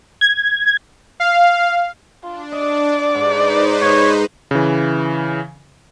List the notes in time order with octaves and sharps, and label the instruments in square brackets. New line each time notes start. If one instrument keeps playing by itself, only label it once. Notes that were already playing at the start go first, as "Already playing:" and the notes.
[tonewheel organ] G#6
[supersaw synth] F5
[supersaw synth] D4 [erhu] F4
[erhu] D5 [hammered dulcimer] D#5
[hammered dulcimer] G#2 [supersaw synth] D#4 B4 C5
[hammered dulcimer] G#2 [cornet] C#5
[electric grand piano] C#3 E3